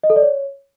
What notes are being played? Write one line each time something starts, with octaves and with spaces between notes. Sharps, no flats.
D#5
A4
D5
C#5